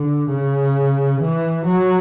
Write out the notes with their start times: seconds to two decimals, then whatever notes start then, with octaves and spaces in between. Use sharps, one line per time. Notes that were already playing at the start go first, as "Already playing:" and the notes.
Already playing: D3
0.29 C#3
1.21 E3
1.66 F#3